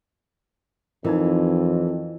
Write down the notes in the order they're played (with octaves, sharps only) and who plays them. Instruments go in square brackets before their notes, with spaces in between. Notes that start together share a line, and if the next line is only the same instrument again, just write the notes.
[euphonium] F2 [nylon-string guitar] E3 [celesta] D#4 E4 A#4